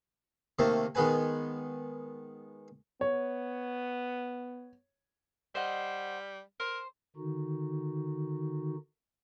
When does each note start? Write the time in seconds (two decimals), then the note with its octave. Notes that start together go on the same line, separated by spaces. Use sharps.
0.59 C3 D#3 A3 A#3
0.95 D#3 G#3 B3 B4 G#5
3.01 B3 C#5
5.55 G3 C5 D#5 F#5
6.60 A#4 C5
7.16 D3 D#3 D#4 F#4